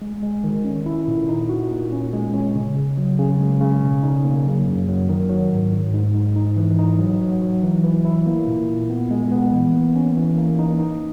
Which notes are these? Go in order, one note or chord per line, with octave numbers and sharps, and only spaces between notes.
G#3
G#3
D#3
C#4
E4
A#2
D#4
F#4
A#2
C#4
G#3
C#4
C#3
C#3
F#3
C#3
G#3
C#3
B2
D#4
A#3
F#3
F#2
F#3
D#3
F#3
G#2
G#2
G#2
G#2
D#4
E3
D#4
F#3
F#3
F#3
E3
E3
E4
A#3
A#2
A#2
B3
G#3
B3
E3
A#3
C#4
E3
A#3
D#4
D#4